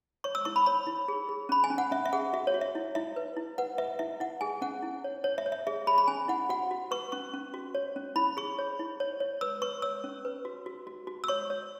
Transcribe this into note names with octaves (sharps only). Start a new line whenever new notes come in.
C#5 C#6
E6
E4 C#6
B5
C#5 B5
E4
G#4
G#4
C#4 B5
G#5
C#4
F#5
C#4 E5
E5
G#4 F#5
F#4 E5
C#5
F#4
E5
E4
E4 E5
B4
E4
B4 F#5
B4 E5
E4 E5
E4 F#5
G#4 G#5
C#4 F#5
E4
C#5
C#5
E5
C#5
E5
G#4 E5
G#4 B5
B5
C#4 G#5
E4 F#5
F#4 F#5
F#4
B4 C#6
C#4 C#6
C#4
F#4
C#5
C#4
E4 B5
G#4 C#6
C#5
E4
C#5
C#5
B4 E6
B4 C#6
C#5 E6
C#4
B4
F#4
F#4
F#4
F#4
E6
C#5 C#6
C#5